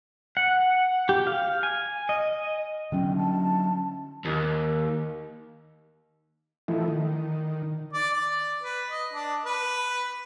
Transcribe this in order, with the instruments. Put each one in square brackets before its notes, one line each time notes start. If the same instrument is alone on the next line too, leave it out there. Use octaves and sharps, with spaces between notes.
[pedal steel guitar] F#5
G4
F5
G#5
D#5
[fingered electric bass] D3 F#3 C#4 [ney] G5
[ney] A5
[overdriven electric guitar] D#2
[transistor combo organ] E3 F3 A3 D#4 E4
D#3
[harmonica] D5
D5
B4
D#5
D4
B4